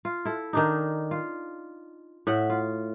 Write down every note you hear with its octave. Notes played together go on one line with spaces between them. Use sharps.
F4
E4 A4
D#3 D4 D#4
F4
A2 E5 F#5
F4